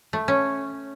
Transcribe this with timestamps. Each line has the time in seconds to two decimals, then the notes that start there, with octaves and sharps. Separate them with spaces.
0.13 A3
0.28 C#4